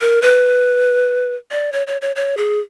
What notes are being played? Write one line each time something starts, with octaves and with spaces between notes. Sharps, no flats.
A#4
B4
D5
C#5
C#5
C#5
C#5
G#4